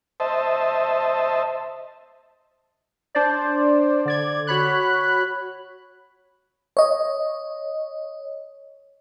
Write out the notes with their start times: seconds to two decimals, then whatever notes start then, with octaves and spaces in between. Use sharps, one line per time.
0.20 C5 D#5 E5 A5
3.15 D4 C5 D5
4.05 D3 D5 G#6
4.47 F#4 C#5 B5 F#6
6.77 C#5 D#5